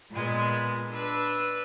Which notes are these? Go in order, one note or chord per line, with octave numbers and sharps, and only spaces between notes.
A#2 G#3 B3
D4 B4 E6